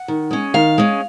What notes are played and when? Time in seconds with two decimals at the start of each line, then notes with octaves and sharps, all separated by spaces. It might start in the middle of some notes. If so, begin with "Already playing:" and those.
Already playing: F#5
0.08 D#3
0.31 G#3 C#4
0.54 D#3 F5
0.78 G#3 C#4